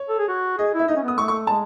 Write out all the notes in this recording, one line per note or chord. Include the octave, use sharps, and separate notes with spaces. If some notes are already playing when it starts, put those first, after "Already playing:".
Already playing: C#5
A4
G#4
F#4
G#4 D#5
E4
E5
D#4 D#5
C#4
B3
D#6
A3 C#6
C#6
G#3 A5